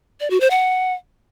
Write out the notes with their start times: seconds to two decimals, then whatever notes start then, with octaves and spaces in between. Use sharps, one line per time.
0.20 D5
0.30 F#4
0.40 C5
0.50 F#5